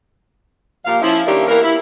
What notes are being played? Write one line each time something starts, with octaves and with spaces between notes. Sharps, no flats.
A#2 F3 G4 F5
F3 C#4 E4
D#3 A#3 C#4 D4 E4 G4
E3 A#3 B3 E4 A#4
E4